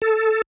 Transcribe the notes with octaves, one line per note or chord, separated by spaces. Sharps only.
A4